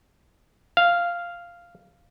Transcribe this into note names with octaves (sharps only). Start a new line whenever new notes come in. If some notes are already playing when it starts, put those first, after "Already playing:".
F5